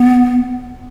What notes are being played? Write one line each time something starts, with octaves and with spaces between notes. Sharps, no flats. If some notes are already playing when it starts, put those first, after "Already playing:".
Already playing: B3